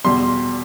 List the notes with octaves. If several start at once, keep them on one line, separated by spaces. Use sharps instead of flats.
E2 B2 G3 C6